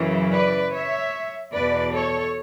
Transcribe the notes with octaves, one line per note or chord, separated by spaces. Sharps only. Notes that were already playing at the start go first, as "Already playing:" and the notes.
Already playing: F#2 C#3 E3
B4 D5
C#5 E5
E2 B2 B4 D5
A4 C#5